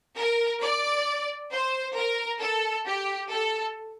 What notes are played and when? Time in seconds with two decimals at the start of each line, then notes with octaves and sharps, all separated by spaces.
0.17 A#4
0.62 D5
1.52 C5
1.96 A#4
2.41 A4
2.86 G4
3.30 A4